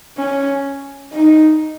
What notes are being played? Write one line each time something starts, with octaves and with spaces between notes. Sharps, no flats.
C#4
D#4